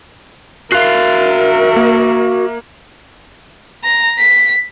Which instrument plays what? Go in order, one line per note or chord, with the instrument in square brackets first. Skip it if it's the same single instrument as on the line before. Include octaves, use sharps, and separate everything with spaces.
[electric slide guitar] F#4 F5 [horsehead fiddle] A#4 E5 [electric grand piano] F#6 C7
[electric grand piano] A#3
[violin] A#5
B6